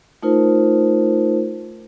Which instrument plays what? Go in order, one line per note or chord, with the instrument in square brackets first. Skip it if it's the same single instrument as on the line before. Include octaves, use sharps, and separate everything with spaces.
[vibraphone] A3 D#4 F4 A#4 C5